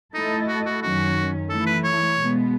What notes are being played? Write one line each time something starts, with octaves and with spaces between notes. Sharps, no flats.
A3 D#4 E4 A4 D#5
F#4
F#4
F#2 D#3 F#3 C#4 F#4
E3 A3 E4 A4
B4
C#5
B2 G#3 B3